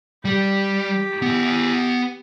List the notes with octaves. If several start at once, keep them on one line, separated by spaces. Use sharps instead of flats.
G3 G4
B3 G#5